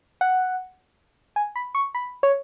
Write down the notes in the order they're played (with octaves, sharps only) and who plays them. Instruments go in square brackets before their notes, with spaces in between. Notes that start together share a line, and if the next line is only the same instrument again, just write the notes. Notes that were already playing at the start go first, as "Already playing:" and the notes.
[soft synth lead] F#5
G#5
B5
C#6
B5
C#5